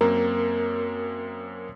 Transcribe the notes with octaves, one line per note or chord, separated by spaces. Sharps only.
F#2 A#3 C4 A#4